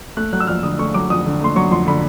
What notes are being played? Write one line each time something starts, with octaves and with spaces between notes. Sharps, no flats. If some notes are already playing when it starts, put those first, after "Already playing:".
A3 F#6
F#3 F#6
E6
F2 F6
D3 D#6
A3 C#6
F#3 D6
F2 D#6
D3
A3 C6
F#3 C#6
F2 C6
D3 B5